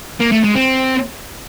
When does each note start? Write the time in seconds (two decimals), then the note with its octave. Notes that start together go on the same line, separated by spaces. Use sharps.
0.20 A#3
0.32 A3
0.44 G#3
0.56 C4